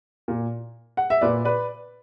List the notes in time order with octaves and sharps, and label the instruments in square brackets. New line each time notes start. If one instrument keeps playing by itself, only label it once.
[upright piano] A#2
F#5
E5
A#2 B4 D5
B4 D5